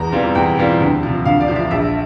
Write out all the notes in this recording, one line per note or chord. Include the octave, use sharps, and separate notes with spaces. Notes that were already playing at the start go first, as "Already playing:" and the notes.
Already playing: E2 A#5
E3 G3 C4 F4
E2 G5
E3 G3 C4 F4
D2
C3 F3
D2 F5
D5
C3 F3
E5
A#1 E5